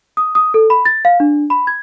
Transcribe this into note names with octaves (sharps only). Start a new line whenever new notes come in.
D#6
D#6
A4
B5
A6
F5
D4
B5
G#6